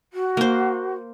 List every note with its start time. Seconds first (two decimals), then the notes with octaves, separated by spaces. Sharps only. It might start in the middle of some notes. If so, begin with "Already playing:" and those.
0.13 F#4
0.37 A#3 C5